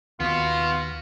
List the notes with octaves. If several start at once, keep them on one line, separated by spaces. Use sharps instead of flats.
D#2 B3 F4 F#4